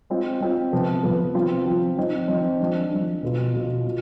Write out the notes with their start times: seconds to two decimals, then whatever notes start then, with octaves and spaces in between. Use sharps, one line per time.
0.10 G#3 C4 F4
0.41 G#3 C4 F4
0.72 C3 F3 B3
1.03 C3 F3 B3
1.35 F3 C4 F4
1.66 F3 C4 F4
1.97 F3 C4 D#4
2.28 F3 C4 D#4
2.60 F3 G#3 D4
2.91 F3 G#3 D4
3.23 B2 B3 F4
3.54 B2 B3 F4
3.85 B2